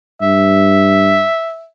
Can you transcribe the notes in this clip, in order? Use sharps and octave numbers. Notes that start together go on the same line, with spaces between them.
G2 E5